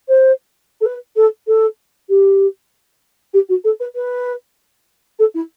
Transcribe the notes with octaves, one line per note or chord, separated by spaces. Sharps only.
C5
A4
B4
A4
A4
G4
G4
F#4
A4
B4
B4
A4
E4